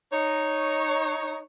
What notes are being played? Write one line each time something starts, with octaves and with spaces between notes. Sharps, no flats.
D#4 C#5